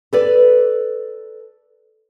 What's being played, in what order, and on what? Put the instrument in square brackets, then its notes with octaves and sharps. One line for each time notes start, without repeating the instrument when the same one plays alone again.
[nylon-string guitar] A4 B4 D5